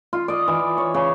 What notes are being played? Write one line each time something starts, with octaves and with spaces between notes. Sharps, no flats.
F4
D5 D#5
E3
C#5
C#3